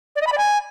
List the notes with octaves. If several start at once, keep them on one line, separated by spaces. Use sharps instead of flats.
D5
D#5
B5
D5
G#5